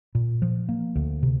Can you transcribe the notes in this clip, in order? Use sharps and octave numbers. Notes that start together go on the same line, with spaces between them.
A#2
F3
A#3
D2
C3